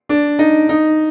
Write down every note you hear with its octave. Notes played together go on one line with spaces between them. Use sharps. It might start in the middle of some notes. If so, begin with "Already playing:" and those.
D4
D#4
D#4